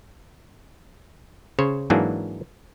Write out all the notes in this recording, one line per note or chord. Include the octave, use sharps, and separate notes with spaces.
C#3 C5 C#5
G#2 E3 F#3 A#3 D4 G#4